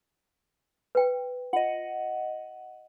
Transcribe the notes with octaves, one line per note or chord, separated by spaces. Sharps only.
B4 G5
F4 D#5 F#5